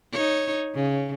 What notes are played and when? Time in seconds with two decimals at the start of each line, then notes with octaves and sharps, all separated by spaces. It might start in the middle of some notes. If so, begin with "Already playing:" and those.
0.12 D#4 C#5
0.75 C#3